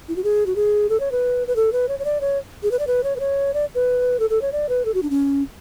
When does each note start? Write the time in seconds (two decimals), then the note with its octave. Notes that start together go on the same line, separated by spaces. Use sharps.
0.09 E4
0.16 F#4
0.24 G#4
0.46 F#4
0.56 G#4
0.89 A4
1.00 C#5
1.12 B4
1.48 B4
1.56 A4
1.72 B4
1.88 C#5
1.99 C#5
2.05 D5
2.21 C#5
2.63 G#4
2.71 B4
2.79 D5
2.87 B4
3.04 C#5
3.16 B4
3.20 C#5
3.54 D5
3.75 B4
4.20 A4
4.30 A4
4.42 C#5
4.52 D5
4.69 B4
4.85 A4
4.94 F#4
5.03 D4
5.10 C#4